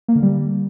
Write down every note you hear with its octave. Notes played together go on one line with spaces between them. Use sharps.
A#3
D3
G3